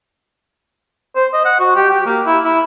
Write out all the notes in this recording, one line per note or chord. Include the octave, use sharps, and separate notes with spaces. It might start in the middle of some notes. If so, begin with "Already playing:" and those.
C5
D#5
F#5
F#4
G4
G4
A#3
E4
E4